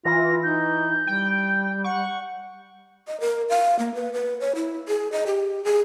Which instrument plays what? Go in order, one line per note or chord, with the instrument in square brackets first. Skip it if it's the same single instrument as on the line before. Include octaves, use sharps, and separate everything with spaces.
[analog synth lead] E3 [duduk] F4 [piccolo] A#6
[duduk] D#4 [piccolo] G6
[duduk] G3 [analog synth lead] G5
[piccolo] F#5 [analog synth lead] C#6
[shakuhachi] D#5
A#4
F5
A#3
B4
B4
C#5
E4
G#4
D#5
G4
G#4